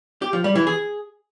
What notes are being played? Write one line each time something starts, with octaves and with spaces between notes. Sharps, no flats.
G4
F3
G3
E3
G#4